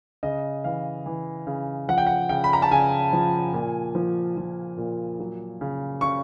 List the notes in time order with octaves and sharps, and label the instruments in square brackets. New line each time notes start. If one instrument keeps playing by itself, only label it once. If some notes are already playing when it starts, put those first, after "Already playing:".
[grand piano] C#3 D#5
E3 F5
E3
C#3
F3 F#5
G5
F#5
C#3 G5
B5
A#5
A5
C#3 G#5
F3
A#2
F3
F3
A#2
F#3
C#3
C#3 C#6